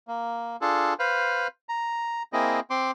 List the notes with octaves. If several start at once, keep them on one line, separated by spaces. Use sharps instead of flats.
A#3
D4 F4 G#4 A4
B4 C5 F5
A#5
A#3 C4 E4 G#4 D#5
C4 C6 D6